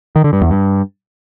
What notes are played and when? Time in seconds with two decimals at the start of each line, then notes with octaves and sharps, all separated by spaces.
0.16 D#3
0.24 D3
0.33 G2
0.41 E2
0.50 G2